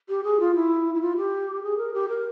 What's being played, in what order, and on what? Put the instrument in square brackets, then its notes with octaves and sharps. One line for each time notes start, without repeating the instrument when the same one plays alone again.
[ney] G4
G#4
F4
E4
E4
F4
G4
G#4
A#4
G4
A#4